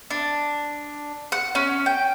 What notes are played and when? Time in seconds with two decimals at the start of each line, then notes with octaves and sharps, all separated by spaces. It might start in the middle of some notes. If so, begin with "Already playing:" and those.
0.11 D4
1.32 F#5
1.55 C#4
1.86 G5